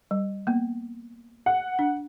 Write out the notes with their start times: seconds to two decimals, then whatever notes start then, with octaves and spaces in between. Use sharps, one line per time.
0.11 G3
0.47 A#3 B3
1.46 F#5
1.79 D4